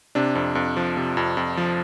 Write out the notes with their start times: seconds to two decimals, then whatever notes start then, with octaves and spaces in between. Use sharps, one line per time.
0.15 C3 D4
0.35 F2
0.55 F2
0.77 F3
0.97 C3
1.17 F2
1.37 F2
1.57 F3